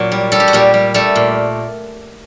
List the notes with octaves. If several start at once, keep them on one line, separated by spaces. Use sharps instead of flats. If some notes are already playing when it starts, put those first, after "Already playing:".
Already playing: A#2 F#3 F#4
G3
G3 A4
G4
F#4
A#2 G3 G4
G3
G3 A3 A4
A#2